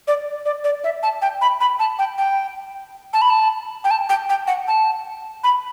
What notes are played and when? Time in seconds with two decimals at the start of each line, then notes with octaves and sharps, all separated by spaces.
0.08 D5
0.46 D5
0.64 D5
0.84 E5
1.03 A5
1.22 G5
1.41 B5
1.61 B5
1.79 A5
1.99 G5
2.18 G5
3.13 A5
3.22 B5
3.30 A5
3.84 G5
3.91 A5
4.09 G5
4.29 G5
4.47 F#5
4.68 A5
5.44 B5